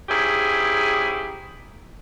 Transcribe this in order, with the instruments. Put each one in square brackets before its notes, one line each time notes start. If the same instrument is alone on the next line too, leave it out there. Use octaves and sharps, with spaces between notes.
[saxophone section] G#2 C#4 E4 G4 G#4